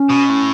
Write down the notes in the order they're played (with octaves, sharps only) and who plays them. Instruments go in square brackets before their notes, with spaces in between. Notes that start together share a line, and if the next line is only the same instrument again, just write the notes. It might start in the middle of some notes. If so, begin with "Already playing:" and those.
Already playing: [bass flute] C#4
[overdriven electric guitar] B2
A2